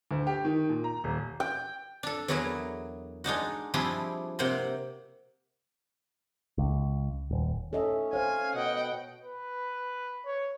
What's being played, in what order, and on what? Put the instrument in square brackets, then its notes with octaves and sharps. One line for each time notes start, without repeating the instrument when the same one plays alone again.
[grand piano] D2
G4
D#3
A#2
A#5
D#1
[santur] G5
[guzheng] D4 A4
E2 F#3 E4 F#4 G#4 A#4
G#3 D4 D#4 F#4
F3 G3 C4 D4 E4 G#4
C3 A#3 F#5 G5 C6
[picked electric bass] C#2
D#1
[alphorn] C#4 [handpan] A4 D#5 E5
[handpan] C5 C#5 [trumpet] F5 [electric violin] G#5
[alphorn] B2 [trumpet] D#5 [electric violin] F#5 G5
[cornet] B4
C#5